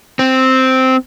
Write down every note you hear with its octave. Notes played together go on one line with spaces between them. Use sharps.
C4